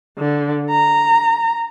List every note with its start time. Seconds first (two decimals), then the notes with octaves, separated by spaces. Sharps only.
0.18 D3
0.70 A#5